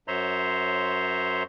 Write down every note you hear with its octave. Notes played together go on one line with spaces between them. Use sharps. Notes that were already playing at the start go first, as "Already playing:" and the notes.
F#2 C5 C#5 E5 A#5 C6